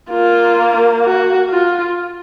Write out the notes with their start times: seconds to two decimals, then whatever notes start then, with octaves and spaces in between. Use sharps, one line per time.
0.11 A#3 F4
1.05 F#4
1.50 F4